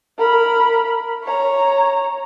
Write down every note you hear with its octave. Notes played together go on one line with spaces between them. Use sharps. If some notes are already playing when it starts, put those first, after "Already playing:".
A#4 B5
C#5 A#5